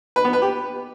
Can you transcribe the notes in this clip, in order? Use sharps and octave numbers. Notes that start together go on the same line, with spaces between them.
B4
B3
B4
G4